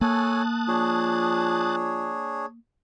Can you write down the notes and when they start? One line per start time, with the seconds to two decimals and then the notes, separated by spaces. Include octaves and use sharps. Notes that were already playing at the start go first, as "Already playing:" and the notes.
0.01 A#3 A4 C#5 G#5 A5 D#6 F#6
0.68 F3 D4 G#4 C#5